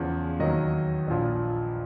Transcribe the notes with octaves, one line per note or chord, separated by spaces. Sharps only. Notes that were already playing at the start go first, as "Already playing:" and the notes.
Already playing: E2 C#3 F3
D#2 D#3 F#3 D#5
A#1 A#2 F3